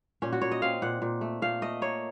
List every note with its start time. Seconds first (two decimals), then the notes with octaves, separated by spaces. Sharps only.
0.22 A#2 C#4
0.32 F#4
0.41 A#2 C#5
0.51 D#5
0.62 C4 F5
0.82 A#2 F#5
1.02 A#2
1.21 A3
1.42 A#2 F5
1.62 A3 D#5
1.81 A#3 C#5